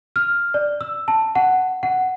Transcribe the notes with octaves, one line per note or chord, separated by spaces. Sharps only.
F6
D5
E6
A5
F#5
F#5